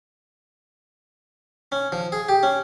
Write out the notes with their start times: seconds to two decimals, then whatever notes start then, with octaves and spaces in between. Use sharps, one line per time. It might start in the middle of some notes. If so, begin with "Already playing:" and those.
1.72 C#4
1.92 F3
2.12 G#4
2.29 G4
2.43 C#4